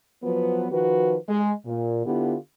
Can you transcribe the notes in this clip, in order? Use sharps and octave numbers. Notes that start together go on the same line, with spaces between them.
F3 F#3 B3
D#3 F3 F#4 B4
G#3
A#2
D3 B3 E4 F4 G4